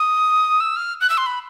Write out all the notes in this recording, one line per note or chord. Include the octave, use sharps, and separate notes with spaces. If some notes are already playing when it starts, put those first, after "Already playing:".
Already playing: D#6
E6
F6
F#6
E6
C6
B5